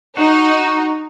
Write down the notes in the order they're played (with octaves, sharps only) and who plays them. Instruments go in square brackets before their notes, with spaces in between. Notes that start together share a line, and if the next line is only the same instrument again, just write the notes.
[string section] D#4 [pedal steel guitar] F#4